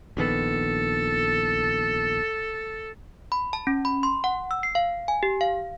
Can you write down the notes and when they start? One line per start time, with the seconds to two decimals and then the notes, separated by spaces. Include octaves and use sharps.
0.17 A#1 D#3 B3 A4
3.32 B5
3.53 A5
3.67 C#4
3.85 B5
4.03 C6
4.24 F#5
4.51 E6
4.63 C7
4.75 F5
5.08 G#5
5.23 G4
5.41 F5